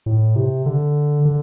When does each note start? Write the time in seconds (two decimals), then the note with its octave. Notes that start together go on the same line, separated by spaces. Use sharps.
0.06 A2
0.36 C3
0.66 D3
1.25 D3